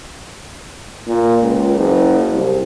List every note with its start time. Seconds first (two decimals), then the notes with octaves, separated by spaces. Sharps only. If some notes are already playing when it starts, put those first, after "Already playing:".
1.07 A#2
1.42 C#2
1.77 F#1
2.31 C2